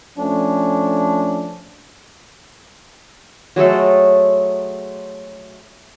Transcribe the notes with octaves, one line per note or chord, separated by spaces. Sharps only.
F3 A3 C#4 D4
F#3 G#3 A3 A4